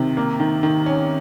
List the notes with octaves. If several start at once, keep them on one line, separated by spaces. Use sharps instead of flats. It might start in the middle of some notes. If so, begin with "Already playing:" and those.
Already playing: C3 D#3
A#3
D#3
D#3
C#4